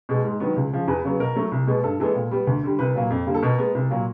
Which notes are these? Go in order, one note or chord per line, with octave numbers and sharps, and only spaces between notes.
B2 G#3
G#2
D#3 F#3 B3
C#2
C#3 F3
E2 B4
C#3 F#3 B3
B2 A#4
F#3 A3
C2
B2 G#3 B3
G2 A4
E3 G#3 B3 A4
A#2
G3 B3
D2
D3 G3
C2 B4
A#2 F#3 A#3
F2
D3 G3 A#3
A4
B2 A#4
G#3 B3
C2
A#2 F#3 A#3